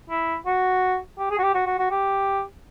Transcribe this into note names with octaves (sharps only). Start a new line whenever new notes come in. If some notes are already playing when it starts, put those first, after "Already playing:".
E4
F#4
G4
G#4
F#4
G4
F#4
F#4
F#4
G4